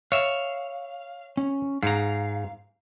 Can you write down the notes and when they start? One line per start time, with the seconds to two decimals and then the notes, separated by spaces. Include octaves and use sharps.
0.12 C#5 E5 F5
1.37 C#4
1.83 G#2 F5 A#5